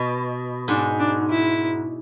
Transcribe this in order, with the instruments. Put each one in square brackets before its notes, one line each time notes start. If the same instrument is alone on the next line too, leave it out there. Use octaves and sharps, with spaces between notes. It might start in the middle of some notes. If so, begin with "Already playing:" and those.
Already playing: [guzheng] B2
[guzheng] G#2 [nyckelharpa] D4
[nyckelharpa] D4
E4